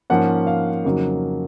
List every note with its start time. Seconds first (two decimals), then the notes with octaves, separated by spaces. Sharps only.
0.10 G#2 F3 A#3 C#4 F#5
0.47 F5
0.85 F2 C#3 F#3 A#3 D#4